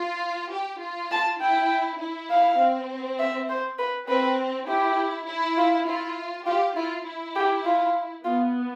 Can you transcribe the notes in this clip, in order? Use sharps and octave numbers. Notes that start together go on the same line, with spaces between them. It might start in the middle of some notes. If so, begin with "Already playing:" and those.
Already playing: F4
G4
F4
A5
E4 G5
E4
F5
C4
E5
C5
B4
C4 B4
E4 G4
E4
F4
E4 F4
F4 G4
E4 F4
E4
G4
F4
B3 F4